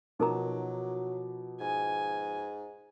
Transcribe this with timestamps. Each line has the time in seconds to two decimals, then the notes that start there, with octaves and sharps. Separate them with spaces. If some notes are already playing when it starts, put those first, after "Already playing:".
0.20 B2 F3 F#3 D#4 A#4 A#5 D6
1.61 G#2 G#5